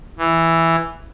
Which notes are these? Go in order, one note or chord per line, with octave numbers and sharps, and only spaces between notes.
E3